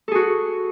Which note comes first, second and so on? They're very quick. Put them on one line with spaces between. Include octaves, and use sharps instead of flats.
A4 G#4 F#4